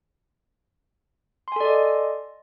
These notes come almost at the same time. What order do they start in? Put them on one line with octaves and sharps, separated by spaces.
C6 G#5 A4 D5 D#5